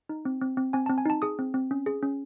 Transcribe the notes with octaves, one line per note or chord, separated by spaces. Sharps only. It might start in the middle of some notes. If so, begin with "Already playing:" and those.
D#4
C4
C4
C4
C4 G#5
C4 A5
G#5
D#4 A5
G#4 D#6
C4
C4
C#4
G#4
C#4